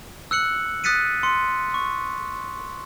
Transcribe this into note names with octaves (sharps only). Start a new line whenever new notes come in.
E6 F#6 C#7 F#7
D#6 F#6 A6 B6 C#7 D#7
C6 C#7
C#6